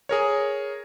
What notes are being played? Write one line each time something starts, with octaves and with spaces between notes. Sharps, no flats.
G#4 A#4 C#5